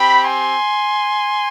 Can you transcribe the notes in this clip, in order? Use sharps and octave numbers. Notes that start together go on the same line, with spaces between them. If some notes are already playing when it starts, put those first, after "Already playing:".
Already playing: C4 G4 G5 B5
G#5 C6